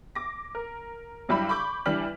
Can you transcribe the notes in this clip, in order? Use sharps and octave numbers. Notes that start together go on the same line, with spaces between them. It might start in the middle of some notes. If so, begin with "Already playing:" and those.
D6 A#6
A#4
G2 F#3 G3 E4 G4 B5
B5 C#6 D6 G6
E3 G3 D4 F6 B6 F#7